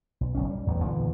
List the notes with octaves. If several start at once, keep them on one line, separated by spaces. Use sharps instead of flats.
B1
F#1 B1 C#4
G3
A1 E2 A2
E2 A#2 D3 D#3